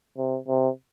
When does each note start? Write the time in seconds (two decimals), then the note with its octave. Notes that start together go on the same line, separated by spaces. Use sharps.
0.17 C3
0.48 C3